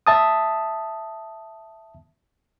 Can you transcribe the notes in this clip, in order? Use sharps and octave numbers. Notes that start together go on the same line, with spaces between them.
E5 A5 D#6